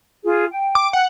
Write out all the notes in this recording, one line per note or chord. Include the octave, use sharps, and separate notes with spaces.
F4 G#4
G5
D6
F#5